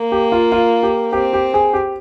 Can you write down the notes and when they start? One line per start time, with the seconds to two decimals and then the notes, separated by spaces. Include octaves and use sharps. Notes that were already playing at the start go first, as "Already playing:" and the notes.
Already playing: A#3
0.12 G4
0.32 F4
0.52 F4
0.83 G4
1.12 C4 G4
1.33 G4
1.54 G#4
1.73 G4